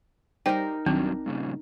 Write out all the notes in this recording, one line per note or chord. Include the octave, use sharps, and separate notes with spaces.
G3 D#4 G4 A#4 C5 G5
B1 G2 D#3 F#3 C4 D4
G2 A#2 C#3